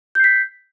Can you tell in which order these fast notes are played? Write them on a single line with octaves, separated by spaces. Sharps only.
G6 C7 B6